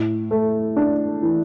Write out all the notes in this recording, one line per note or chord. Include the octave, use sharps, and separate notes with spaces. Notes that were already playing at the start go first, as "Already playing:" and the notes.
Already playing: A2
A3
D4
E3